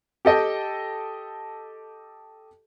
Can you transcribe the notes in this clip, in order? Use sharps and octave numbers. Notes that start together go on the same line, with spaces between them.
G4 A4 D#5 G5